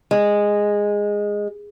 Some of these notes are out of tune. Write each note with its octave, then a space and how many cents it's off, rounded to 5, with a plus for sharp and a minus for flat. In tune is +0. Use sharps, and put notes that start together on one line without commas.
G#3 -10